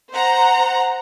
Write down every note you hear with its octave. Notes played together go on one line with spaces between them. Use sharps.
C5 F#5 A#5